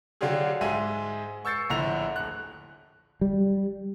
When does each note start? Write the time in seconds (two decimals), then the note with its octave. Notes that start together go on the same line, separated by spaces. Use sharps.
0.21 D3 F#3 D4 F4 G4 G#4
0.61 G#2 G#3 E5 G#5 D#7
1.45 C#6 E6 G6 A6 C7 C#7
1.70 A#1 A2 D3 A#5 F7
2.16 D#1 F#6
3.21 G3